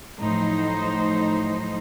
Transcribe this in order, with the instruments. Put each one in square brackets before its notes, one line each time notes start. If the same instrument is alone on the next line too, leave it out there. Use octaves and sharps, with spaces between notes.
[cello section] A2 F3 F#3 D#4 C5